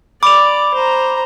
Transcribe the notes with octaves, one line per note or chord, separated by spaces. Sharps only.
D5 B5 D6 F7
C5 A#5